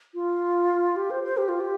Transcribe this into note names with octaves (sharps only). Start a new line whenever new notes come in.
F4
G4
C5
C5
G4
F4
G4